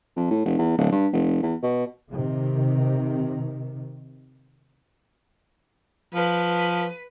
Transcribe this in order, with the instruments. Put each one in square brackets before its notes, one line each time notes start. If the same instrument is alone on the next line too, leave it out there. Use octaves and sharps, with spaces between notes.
[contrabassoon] F2
A2
F1
E2
D1
G2
F1
E2
B2
[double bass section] C3 D#3
[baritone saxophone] F3 [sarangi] B4